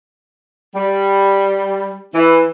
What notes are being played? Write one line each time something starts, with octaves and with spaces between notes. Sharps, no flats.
G3
E3